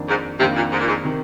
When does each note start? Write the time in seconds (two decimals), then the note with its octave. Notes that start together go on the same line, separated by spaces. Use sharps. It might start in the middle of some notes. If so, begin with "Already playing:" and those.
Already playing: F2 D#3 A#3 D4
0.08 G#2
0.39 F2 C3 D#3 A#3 D4
0.55 A#2
0.71 G#2
0.80 A#2
0.87 G#2
1.04 C3 D#3